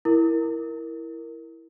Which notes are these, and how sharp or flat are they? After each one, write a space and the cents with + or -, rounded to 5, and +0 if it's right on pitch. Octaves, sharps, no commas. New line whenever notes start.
E4 +0 A#4 +0